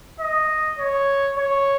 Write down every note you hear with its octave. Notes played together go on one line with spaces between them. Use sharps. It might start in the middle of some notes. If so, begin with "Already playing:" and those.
D#5
C#5
C#5